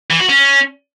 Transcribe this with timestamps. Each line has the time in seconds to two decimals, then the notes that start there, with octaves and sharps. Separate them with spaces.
0.10 E3
0.20 F#4
0.29 C#4